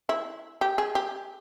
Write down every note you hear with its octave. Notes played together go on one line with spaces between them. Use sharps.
E4
G4
G#4
G4